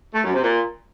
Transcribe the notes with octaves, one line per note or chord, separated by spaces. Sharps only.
A3
F#2
C3
A#2